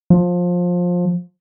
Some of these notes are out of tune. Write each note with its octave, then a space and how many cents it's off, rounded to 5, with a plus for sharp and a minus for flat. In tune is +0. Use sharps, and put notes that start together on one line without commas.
F3 +20